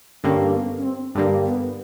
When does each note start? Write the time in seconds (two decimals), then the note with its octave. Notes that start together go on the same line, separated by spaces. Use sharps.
0.24 G2 D3 G3 A#3 C#4
0.54 B3
0.77 C#4
0.84 C4
1.15 G2 D3 G3 A#3 D4
1.46 B3